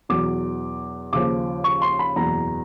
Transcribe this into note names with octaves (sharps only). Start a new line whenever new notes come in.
E2 B2 F#3 D6
D#2 C#3 F3 D6
C#6
C6
B5
F#1 E2 B2 A#5